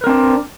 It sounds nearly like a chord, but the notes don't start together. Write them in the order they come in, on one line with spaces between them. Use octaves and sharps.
B4 A#4 C4 D4